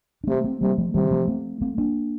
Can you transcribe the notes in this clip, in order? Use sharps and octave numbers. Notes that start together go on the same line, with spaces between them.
D4
C3 A3 C4
A3 C4
C3 G3 A#3
F3 A3
C3 D#3 G3
F3 A3
A3 C4
A3 C4
A#3 D4